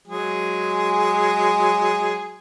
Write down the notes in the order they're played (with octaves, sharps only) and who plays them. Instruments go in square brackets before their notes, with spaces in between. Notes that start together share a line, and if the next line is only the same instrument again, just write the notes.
[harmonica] F#3 G#3 G#4